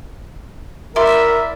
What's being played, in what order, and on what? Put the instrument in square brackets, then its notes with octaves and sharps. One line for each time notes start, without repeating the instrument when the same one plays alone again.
[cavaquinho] E4 D5 C6 [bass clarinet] A#4 [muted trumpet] E5